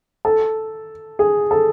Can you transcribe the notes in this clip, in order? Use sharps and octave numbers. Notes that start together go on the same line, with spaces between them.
A4
G#4
A4